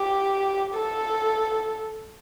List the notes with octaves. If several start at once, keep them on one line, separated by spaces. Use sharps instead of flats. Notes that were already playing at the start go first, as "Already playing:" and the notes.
Already playing: G4
A4